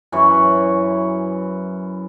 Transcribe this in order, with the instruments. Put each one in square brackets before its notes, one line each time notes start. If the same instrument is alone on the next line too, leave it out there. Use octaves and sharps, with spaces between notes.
[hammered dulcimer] F#2 E3 C#4 C#5